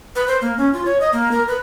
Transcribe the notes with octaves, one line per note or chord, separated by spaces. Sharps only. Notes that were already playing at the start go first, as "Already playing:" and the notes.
B4
C5
A#3
C#4
F4
C#5
D#5
A#3
A#4
B4